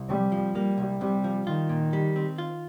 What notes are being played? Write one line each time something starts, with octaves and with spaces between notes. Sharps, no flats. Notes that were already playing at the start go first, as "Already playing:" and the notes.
Already playing: C2
C3 G3
F3
G3 A#3
C2
C3 G3
F3
D#3 F4
A#2
G3
C4
F4